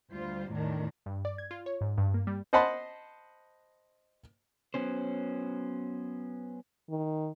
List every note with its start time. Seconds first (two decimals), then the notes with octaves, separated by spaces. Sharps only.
0.11 D2 G3 F4 C5
0.51 E2 A2 D#3 D4
1.06 G2
1.25 D5
1.38 G#6
1.51 F4
1.66 C#5
1.81 G#2
1.98 G2
2.14 A#3
2.27 G3
2.53 C5 D#5 F#5 A5 B5 C6
4.74 F#3 B3 C#4 C5
6.90 D#3